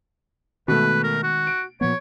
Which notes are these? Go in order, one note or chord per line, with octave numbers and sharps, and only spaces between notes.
B2 D#3 G#3 A3 B4
A#4
F#4
D7
A#2 F3 B3 C#5